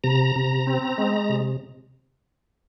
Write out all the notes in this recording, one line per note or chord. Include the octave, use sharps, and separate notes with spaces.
C3 A#5
C3
C4
G#3
C3